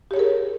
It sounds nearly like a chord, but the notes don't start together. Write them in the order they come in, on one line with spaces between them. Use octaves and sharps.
G4 C#5 G#4 A#4